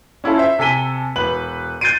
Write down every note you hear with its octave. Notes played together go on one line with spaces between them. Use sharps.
C#4 E4 F4 A4
C5 E5
C3 A4 G#5 B6 D#7 G7
E1 B4 F#7
F#6 G6 A6 C7 D7 D#7